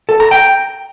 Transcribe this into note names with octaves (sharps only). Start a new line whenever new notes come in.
A4
A#5
G5